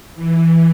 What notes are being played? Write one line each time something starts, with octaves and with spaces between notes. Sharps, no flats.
E3